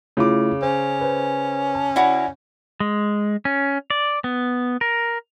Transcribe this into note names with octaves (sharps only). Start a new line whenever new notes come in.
C#3 A3 E4 F4 D6
C#4 C5
B4 C5
A5
E4 F#4 D5
G#3
C#4
D5
B3
A#4